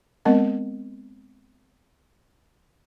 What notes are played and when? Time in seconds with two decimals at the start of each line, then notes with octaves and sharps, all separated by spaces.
0.25 G#3 B3 C4 A#4 D#5 F#5